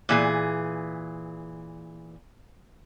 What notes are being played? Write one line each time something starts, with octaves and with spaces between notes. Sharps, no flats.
A#2 E3 G#4